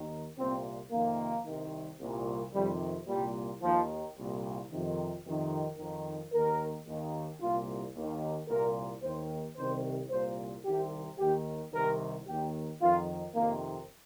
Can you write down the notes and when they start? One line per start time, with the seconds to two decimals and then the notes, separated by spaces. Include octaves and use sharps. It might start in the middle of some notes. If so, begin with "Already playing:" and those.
Already playing: D#2 D#3
0.38 C2 A#2 C4
0.92 F2 C3 D#3 A#3
1.46 C2 C3 D#3
2.00 C2 A#2
2.54 F2 C3 D#3 G3
3.08 C2 A#2 G3
3.63 D#2 D#3 F3
4.16 C2 A#2
4.70 F2 C3 D#3
5.25 F2 C3 D#3
5.79 F2 D#3
6.32 D#2 D#3 A#4
6.86 D#2 D#3
7.40 C2 A#2 F4
7.94 D#2 D#3
8.48 C2 A#2 A#4
9.02 D#2 D#3 C5
9.57 C2 C3 D#3 C5
10.10 C2 A#2 C5
10.65 C2 C3 D#3 G4
11.19 D#2 D#3 G4
11.73 C2 C3 D#3 A#4
12.27 D#2 D#3 G4
12.81 F2 D#3 F4
13.35 F2 C3 D#3 A#3